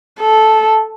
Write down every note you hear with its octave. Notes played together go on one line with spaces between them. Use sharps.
A4